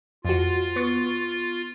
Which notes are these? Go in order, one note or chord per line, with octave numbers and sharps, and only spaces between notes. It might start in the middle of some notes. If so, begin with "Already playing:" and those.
F2 F4 F#4
B3 C#6 A6